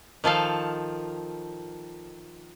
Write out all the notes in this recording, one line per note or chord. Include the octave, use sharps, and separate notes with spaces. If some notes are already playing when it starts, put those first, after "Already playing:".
D#3 F3 A4 F5